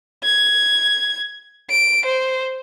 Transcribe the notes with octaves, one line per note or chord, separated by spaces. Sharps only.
G#6
D7
C5